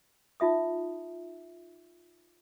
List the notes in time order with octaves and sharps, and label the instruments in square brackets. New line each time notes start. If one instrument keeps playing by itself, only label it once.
[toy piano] D#4 F4 E5 D#6